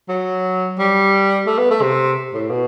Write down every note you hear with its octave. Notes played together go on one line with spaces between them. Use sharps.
F#3
G3
A3
B3
A3
C3
A2
B2